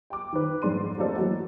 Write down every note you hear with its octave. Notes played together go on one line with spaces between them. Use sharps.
G5 D6
D#3 B4
F2 G#2 D4 C6 D#7
A3 A#3 C4 D4 A4 D#5
E3 F#3 F#4